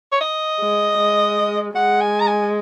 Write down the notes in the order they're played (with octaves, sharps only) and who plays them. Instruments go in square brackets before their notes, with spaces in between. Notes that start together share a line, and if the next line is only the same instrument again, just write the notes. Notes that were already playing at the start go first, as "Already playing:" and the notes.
[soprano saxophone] C#5
D#5
[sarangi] G#3
G#3
[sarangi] G#3 [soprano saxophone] F#5
[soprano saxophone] G#5
A#5
G#5